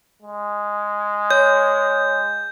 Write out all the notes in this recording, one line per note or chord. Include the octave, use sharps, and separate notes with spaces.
G#3
C#5 G6